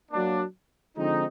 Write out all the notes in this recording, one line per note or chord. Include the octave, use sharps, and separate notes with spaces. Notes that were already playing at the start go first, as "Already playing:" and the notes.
F#3 A#3 D4
D3 F3 G#3 C4 D#4